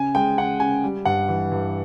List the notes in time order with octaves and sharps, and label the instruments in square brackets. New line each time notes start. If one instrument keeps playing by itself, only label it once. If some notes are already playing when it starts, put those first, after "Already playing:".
Already playing: [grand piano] C#3 G#5
G#3 G5
C#3 F#5
C#3 G#5
G3
G2 F#5
E3
G2